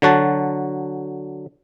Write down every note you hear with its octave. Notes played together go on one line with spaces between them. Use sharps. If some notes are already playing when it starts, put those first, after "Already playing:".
D3 F#3 F#4 A5